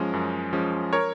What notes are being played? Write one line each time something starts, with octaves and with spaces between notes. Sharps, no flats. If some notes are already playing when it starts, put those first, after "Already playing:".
Already playing: F#2 F3 G#3 C#4
F#2
F3 G#3 C#4
A#4 C#5